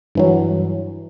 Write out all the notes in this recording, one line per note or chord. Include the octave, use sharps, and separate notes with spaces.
G2 E3 F#3